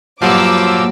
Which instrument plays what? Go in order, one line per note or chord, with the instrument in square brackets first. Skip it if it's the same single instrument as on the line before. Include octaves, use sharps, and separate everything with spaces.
[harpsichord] G2 F#3 [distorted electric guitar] A#2 [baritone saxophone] F3 [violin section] D6 E6